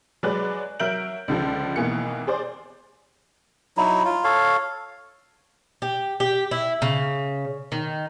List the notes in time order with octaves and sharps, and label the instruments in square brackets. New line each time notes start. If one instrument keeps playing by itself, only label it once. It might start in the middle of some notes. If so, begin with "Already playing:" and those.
[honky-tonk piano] F#3 G#3 B4 D5 F#6
F#3 A#4 E5 G6 D7 F#7
C#2 D3 F3
G#1 B2 E3 A#3 C#7
G#4 C5 D5
[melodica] F#3 D#4 E4
F4
A4 C#5 F5
[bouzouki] G4
G4
E4
C#3
D#3